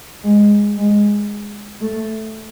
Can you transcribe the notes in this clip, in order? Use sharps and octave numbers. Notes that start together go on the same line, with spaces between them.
G#3
G#3
A3